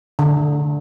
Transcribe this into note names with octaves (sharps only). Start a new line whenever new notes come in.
D3